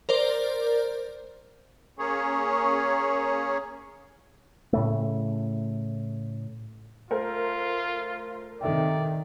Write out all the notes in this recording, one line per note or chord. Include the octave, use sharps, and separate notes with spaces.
A#4 C5 D5
A#3 C#4 G#4 C#5
A2 C#3 A3
A3 F4 A#4 C5
C3 D#3 A4 D5 E5 G5